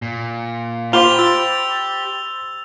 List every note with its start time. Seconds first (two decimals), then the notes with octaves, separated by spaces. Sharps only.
0.02 A#2
0.93 F4 G4 C5 B5 D6 F7 G7
1.19 E6 A6